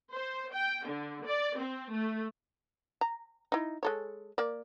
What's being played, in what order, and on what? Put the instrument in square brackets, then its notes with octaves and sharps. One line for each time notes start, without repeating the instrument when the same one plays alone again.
[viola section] C5
G5
D3
D5
C4
A3
[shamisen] A#5
D#4 E4
G#3 A4 C#5
A#3 D5